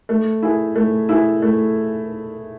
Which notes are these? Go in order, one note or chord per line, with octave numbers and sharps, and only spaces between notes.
A3
E4 G#4
A3
E4 G#4
A3